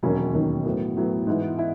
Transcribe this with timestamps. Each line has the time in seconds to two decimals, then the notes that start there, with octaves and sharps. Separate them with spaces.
0.02 E1 D#2 D#3 F#3 C#4
0.34 E1 D#2 D#3 F#3 C#4
0.65 A2 F#3 B3
0.97 A2 F#3 B3
1.27 G#2 E3 B3 E4
1.58 E4